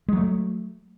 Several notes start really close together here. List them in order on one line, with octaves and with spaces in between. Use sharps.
G#3 F#3 A3